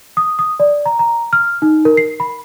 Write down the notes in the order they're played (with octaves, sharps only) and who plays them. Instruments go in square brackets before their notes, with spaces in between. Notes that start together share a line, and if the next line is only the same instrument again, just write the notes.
[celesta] D#6
D#6
D5
A#5
A#5
F6
D#4
A#4
C7
B5